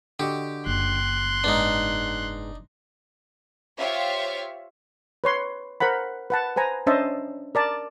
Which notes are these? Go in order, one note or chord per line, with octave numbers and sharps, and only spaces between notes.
D3 F#4 G4 D#5
F#1 C6 F#6
G#2 G#3 B3 D4 D#4
F4 G4 C5 C#5 E5 F5
B4 C#5 C6
A#4 C5 F#5 B5
B4 F#5 A5
B4 C5 G#5 A#5
C#4 D4 C5 D#5 E5 A5
A#4 D5 A5